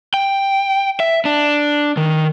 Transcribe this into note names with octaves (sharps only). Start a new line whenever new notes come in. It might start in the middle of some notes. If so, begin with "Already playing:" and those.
G5
E5
D4
D#3